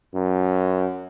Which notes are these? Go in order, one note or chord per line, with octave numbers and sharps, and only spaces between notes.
F#2